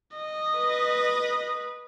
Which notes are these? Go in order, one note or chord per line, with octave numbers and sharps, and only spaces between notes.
D#5
B4